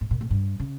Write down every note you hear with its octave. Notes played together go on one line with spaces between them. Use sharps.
A2
A#2
A2
G2
C#3